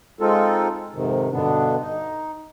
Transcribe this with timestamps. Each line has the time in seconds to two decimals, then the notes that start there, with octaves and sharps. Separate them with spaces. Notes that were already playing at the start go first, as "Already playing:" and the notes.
0.20 G#3 C4 D#4 F4 A4
0.95 F2 G#2 C3 D#3
1.32 G2 B2 D3 B3 D4
1.81 D#4